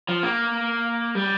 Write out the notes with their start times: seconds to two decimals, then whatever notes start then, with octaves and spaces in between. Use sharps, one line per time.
0.09 F3
0.23 A#3
1.15 G3